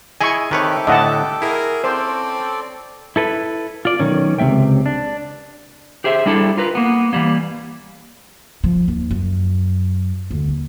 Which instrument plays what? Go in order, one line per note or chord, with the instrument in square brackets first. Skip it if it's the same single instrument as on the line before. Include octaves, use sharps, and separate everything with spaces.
[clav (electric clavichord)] E4 G#4 D#5 [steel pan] G#5 C#6
[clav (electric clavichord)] D#3 B4 C#5 [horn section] C4 E5 [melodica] G4 A4 D6
[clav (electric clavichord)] A2 D3 [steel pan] D#5 F#5 A5
[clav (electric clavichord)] E4 [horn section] F#4 G#4 A#4
[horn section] C4 C#4 [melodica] A4 D5 [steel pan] C5
[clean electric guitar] E4 A4 B4
F4 D5
B1 D#3 C#4
C#2 C3 G#3 E5 G5
D4
[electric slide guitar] G4 G#4 C5 E5
G3 D4 E4 A4
F4 A#4 B4
A#3 B3
E3 F3 G3 A#3
[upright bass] F3
D#2
F#2
D2
D#2